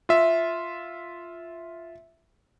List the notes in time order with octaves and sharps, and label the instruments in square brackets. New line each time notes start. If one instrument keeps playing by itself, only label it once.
[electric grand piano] F4 E5